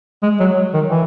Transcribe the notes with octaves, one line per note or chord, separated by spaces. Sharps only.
G#3
F#3
D#3
E3